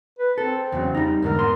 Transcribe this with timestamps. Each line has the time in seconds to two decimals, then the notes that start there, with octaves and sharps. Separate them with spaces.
0.19 B4
0.38 C4 A4
0.72 E2 C#3 F#3
0.95 G3 D#4
1.22 E2 G#2 D3 A#4
1.39 B3 C6